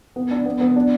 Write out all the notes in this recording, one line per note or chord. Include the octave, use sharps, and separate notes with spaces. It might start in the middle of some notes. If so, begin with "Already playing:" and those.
B3
D4
B3
B3
D4